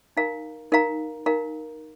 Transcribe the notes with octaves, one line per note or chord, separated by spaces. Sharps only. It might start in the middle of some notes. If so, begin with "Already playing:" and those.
D#4 A#4 F5 A#5
D#4 A#4 F5 A#5
D#4 A#4 F5 A#5